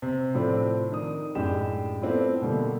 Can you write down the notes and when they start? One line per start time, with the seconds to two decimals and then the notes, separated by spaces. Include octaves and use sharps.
0.02 C3
0.35 A2 C3 F3 A3 C4 D4
0.92 D#3 D4 D#6
1.35 F#2 A2 G#3 D4 G4 E7
2.02 A3 B3 C4 D4 E4 F4
2.42 B2 D3 G3 A3 A#3